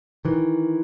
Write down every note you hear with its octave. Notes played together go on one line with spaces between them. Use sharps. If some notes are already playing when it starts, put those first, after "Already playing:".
D#3 E3